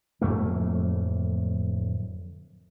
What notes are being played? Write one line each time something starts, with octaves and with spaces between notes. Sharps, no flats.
D1 F2 A3 A#3